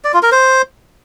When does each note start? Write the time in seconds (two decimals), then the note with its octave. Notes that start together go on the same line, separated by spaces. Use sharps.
0.04 D5
0.14 F4
0.23 A#4
0.32 C5